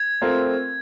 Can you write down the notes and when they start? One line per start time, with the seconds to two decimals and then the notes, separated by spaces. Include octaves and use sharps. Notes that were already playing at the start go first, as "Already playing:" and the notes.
Already playing: G#6
0.22 A3 C4 F4 A#4